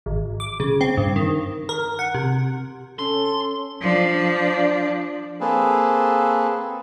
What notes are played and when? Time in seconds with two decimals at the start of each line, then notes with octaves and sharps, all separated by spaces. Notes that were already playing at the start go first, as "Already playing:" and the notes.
0.06 G#1
0.40 D6
0.60 C#3
0.81 C4
0.97 G2
1.16 D#3
1.69 A#4
1.99 F#5
2.14 C3
2.99 C#4 A4 C6
3.81 F3 D4
5.40 A#3 C4 G#4 A4 B4